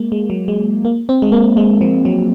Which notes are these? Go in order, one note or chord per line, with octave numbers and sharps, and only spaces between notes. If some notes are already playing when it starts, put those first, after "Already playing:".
Already playing: G#3 A#3
G#3
F#3
G#3
A#3
C4
G#3
A#3
G#3
F3
F#3